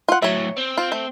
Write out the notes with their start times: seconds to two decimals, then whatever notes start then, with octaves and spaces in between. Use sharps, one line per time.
0.09 F4 F#5
0.22 A2 F#3 C#5 E5
0.58 C4
0.78 F4
0.92 A3